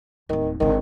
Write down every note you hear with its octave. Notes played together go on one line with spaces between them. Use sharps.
D1 D#2 D#3
G#1 D3 D#3